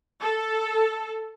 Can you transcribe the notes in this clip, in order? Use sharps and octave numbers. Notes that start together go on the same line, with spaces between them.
A4